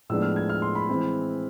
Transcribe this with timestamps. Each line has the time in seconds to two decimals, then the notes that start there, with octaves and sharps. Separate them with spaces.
0.10 A2 F3 G#3 B3 D4 E6
0.22 F6
0.36 G#6
0.49 F6
0.62 C6
0.75 B5
0.89 E3 G#3 C4